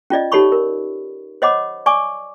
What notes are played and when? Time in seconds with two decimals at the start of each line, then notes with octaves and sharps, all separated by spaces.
0.10 C#4 F4 D5 D#5
0.32 D#4 G4 A4 C#5 B5 C#6
0.52 A#4
1.42 C5 C#5 D#5 F#5 B5 D6
1.86 D5 G#5 C#6 D6